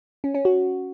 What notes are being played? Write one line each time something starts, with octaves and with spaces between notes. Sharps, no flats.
C#4
C#4
F#4